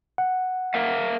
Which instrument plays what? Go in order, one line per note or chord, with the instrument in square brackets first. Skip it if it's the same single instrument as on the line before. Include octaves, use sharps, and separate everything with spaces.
[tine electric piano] F#5
[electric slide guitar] A#4 E5 F5